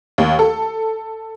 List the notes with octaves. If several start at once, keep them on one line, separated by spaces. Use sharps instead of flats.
D#2
A4